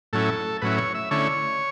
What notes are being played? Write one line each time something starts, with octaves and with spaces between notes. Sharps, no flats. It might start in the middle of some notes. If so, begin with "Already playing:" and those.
A2 F#3 C#4 E4 A4
A2 F#3 C#4 E4 B4
C#5
E5
D3 A3 C#4 E4 C#5